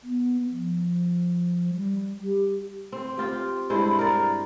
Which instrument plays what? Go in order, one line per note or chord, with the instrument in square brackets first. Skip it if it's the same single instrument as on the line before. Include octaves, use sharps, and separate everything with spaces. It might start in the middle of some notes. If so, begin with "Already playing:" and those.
[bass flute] B3
F3
G3
G4
[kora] C4
C4 F4 G4
G2 G#3 E4 C5
A#4 D5